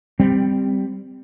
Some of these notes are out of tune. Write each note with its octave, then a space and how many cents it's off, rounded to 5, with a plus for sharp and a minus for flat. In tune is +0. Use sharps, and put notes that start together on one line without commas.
G3 +10 C4 -10